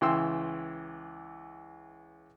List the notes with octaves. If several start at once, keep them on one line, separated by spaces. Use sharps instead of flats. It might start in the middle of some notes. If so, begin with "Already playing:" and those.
C#2 E3 G5 C6 E6